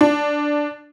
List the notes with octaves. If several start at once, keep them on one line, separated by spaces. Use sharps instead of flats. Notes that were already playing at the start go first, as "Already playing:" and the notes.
D4